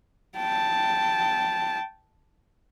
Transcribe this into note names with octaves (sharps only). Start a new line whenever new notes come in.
G5 A5